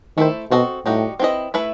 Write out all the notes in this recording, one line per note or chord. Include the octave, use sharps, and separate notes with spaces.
D#3 A3 E4 A4 C5
B2 C4 F#4 A4 D#5
A2 G3 D#4 F#4
C4 E4 B4 D#5
A3 E4 B4 E5